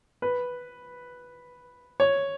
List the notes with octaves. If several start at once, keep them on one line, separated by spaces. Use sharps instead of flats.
B4
C#5